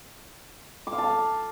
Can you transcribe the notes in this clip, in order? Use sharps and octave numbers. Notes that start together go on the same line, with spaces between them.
D6
F5
A5
F5